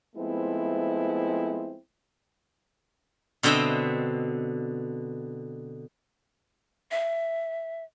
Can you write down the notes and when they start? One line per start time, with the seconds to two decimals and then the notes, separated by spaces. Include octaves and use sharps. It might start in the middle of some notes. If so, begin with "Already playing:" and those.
0.15 F3 G#3 A3 B3 C4 E4
3.43 B2 D3 C4 D#5 E5 G5
6.91 E5